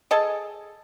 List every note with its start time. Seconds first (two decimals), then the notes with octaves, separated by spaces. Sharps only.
0.11 G#4 A4 D#5 A5